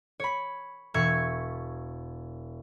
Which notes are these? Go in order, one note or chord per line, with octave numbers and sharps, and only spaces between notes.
C#5 B5
E1 E5 C#6 G#6